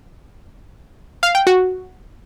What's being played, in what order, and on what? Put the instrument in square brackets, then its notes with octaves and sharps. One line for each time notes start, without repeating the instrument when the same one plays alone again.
[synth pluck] F5
G5
F#4